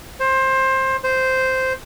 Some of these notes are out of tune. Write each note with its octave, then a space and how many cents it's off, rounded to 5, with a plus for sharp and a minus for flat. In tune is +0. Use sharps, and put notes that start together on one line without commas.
C5 +20
C5 -5